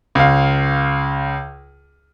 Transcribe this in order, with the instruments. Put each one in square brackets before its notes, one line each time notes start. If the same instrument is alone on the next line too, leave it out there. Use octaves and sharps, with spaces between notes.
[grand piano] C#2 F5